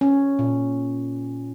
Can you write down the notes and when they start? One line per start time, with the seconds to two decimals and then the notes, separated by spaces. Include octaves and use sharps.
0.01 C#4
0.39 A#2